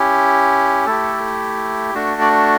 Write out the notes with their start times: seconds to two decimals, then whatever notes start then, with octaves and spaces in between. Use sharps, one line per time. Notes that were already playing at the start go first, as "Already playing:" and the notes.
Already playing: C#4 E4 G4
0.86 A3 E4 G4 A4
1.95 A3 D4 F#4
2.21 D5